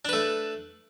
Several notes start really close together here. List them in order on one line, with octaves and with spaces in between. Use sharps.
D4 B4 A3